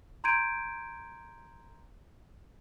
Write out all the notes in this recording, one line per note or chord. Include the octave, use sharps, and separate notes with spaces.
A#5 C6 G6 G#6 D7 D#7